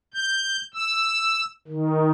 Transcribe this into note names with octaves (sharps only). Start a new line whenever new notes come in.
G6
E6
D#3